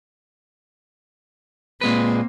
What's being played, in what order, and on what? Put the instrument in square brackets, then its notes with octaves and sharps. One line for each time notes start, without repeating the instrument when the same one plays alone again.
[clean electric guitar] A#2 G#3 B4 [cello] A#3 C4